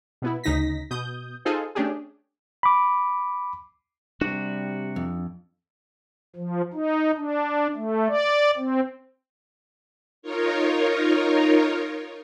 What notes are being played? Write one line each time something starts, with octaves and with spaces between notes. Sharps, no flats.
B2 B3 E4
D2 C#3 D#4 A#6 B6
B2 D#6 G6
D#4 F4 G#4 A4 C5
A3 C#4 D4 G4 G#4
B5 D6
C3 G3 D4 F#4
F2
F3
D#4
D4
A3
D5
C4
D#4 F4 A#4 C#5